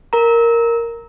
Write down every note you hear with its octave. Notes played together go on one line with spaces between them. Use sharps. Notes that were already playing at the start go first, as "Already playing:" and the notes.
A#4 A#5